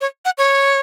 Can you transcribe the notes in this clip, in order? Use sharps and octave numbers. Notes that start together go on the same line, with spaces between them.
C#5
F#5
C#5